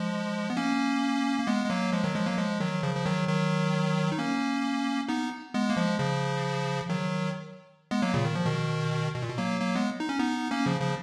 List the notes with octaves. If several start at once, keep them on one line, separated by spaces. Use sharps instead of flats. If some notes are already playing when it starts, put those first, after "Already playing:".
Already playing: F3 G#3
B3
A#3 C#4
A#3
G#3 B3
G#3
F#3 A#3
F3 G#3
D#3 F#3
F3 G#3
F#3 A#3
F3 G#3
D#3 F#3
C#3 F3
F3
D#3 F#3
D#3 F#3
D#4
A#3 C#4
B3 D#4
G#3 B3
A#3
F3 G#3
C#3 F3
D#3 F#3
G#3 B3
F#3 A#3
A#2 C#3
D#3
F3
B2 D#3
B2
A#2
B2
F#3 A#3
F#3 A#3
G#3 B3
D#4
C#4
B3 D#4
A#3 C#4
C#3 F3
C#3 F3